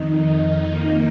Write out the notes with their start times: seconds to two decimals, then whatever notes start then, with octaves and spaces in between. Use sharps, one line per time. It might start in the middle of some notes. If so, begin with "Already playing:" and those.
Already playing: F2 D#3 D#4
0.54 A#3